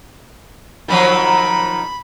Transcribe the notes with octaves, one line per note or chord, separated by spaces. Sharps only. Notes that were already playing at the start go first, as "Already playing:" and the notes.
D#3 F3 F#3 B5